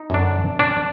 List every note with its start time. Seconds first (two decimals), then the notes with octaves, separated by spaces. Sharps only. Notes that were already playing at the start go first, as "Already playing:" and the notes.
Already playing: D#4
0.10 F#2 D3 F#3 D4
0.59 D4